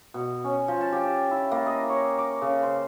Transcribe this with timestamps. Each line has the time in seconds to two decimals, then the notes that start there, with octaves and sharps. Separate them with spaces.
0.14 B2
0.44 C#4
0.68 F3
0.81 A5
0.93 G4
1.31 E4
1.51 A#3
1.66 D#5
1.89 C#5
2.18 D6
2.42 C#3
2.63 C5